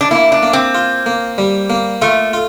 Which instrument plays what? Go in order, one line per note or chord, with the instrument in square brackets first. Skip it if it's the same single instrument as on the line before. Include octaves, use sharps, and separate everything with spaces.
[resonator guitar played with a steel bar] D4
[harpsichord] A#3 [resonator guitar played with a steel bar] E4
[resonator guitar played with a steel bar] D4
[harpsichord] A#3
[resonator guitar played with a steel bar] C4
[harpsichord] F4
A#3
G3
A#3
[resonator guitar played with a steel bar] A3 [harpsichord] F4
[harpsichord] F4